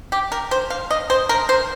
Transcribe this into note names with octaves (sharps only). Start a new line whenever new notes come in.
G4
A#4
C5
F5
D#5
C5
A#4
C5